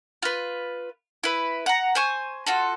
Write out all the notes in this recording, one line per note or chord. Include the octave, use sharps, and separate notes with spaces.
F4 B4
E4 B4
F#5 A#5
C5 G#5 C#6
F4 F#4 A4